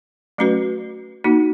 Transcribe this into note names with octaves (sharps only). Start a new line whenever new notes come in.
F#3 A3 C#4 F#4 B4
A#3 D#4 F#4